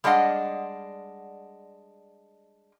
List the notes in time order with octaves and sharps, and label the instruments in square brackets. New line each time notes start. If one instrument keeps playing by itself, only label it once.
[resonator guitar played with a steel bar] G3 G#3 D4 D#5 F#5